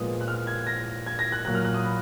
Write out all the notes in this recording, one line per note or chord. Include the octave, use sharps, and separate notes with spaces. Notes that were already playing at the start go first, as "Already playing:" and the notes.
Already playing: A#2 F3 G#3 B3 D#6
F#6
F6
G#6
A#6
G#6
A#6
F#6
A#2 F#3 A#3 F#6
F6
F#6
D#6
B5